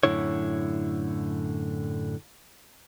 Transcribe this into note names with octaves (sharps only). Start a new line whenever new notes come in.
F#2 A2 D3 E4 C#5